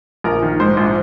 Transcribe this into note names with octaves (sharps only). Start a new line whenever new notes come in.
A#1 A#4 A#5
D#3
G#2 C5
A#1